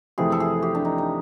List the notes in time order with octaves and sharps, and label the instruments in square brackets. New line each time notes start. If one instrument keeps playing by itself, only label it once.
[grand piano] F2 C3 E3 A3 [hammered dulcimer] G#4
[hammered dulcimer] A4
G#4
G4
D4
D#4
D#4